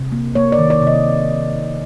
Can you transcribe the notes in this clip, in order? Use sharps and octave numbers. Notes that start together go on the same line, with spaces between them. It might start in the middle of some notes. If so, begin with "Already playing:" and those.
Already playing: C3
A#3
A#3 C#5
D5
D#3
D5
C3
D#5